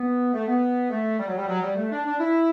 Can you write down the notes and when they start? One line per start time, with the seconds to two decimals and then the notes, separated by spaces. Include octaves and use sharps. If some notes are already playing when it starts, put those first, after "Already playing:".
Already playing: B3
0.33 A3
0.48 B3
0.90 A3
1.19 G3
1.28 F#3
1.38 G3
1.47 F#3
1.62 G3
1.76 A3
1.90 D4
2.05 D4
2.19 E4